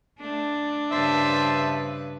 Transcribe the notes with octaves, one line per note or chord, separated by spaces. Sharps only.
A3 D4
G2 C#3 B4 C5 E5 A5 C6